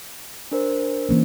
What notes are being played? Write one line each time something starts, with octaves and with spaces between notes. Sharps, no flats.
D4 A#4 C5
E3 A#3 C#4